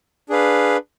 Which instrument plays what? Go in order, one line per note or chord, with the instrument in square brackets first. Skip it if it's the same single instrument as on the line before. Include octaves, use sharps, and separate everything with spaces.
[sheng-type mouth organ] D4 G#4 B4 F5